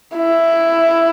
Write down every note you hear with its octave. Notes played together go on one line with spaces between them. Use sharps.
E4